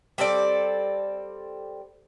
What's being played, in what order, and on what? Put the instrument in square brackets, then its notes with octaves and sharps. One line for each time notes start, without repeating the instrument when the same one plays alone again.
[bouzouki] G3 C4 A4 D5